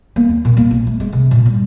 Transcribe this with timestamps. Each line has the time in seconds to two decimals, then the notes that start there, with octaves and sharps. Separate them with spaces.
0.16 A#3
0.29 D#2
0.45 A#2
0.57 A#3
0.71 A#1
0.87 A3
1.00 G#3
1.13 C3
1.31 A#2
1.46 G2